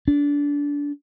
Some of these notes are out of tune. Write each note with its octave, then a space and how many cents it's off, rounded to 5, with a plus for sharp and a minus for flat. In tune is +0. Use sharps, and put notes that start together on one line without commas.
D4 -25